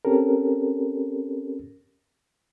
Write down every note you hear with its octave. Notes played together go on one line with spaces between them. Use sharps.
C4 C#4 G4 A4 A#4